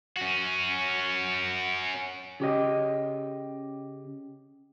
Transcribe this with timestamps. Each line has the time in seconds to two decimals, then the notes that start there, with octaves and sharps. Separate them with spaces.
0.17 C#4 F#4
2.40 C#3 G4 D#5